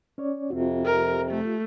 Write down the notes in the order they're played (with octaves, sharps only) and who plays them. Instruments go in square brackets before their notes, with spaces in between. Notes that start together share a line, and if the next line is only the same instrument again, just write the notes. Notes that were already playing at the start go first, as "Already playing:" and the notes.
[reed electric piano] C#4 C#5 D5
[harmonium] F2 C3 [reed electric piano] C4 F4 F#4
[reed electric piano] F4 G4 [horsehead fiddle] A#4
[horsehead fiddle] A3